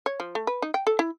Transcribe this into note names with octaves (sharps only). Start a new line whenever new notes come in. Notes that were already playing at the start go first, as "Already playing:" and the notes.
C#5
F3
A3
B4
D#4
G5
A4
E4